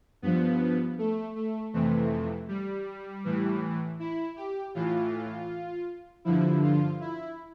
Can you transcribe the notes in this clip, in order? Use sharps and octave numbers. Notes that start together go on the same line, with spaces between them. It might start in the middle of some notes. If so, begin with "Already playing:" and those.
G2 F3 B3
A3
A3
F2 C3 E3 A3
G3
A2 E3
E4
G4
A2 E3 F4
G2 D3 F3 E4
F4
E4